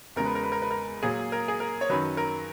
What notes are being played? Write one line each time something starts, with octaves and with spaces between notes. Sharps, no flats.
E2 C#3 G#3 A#4
B4
A#4
B4
A#4
B4
A#4
A#2 F#3 G#4
A#4
G#4
A#4
C#5
F#2 D#3 F#3 B4
A#4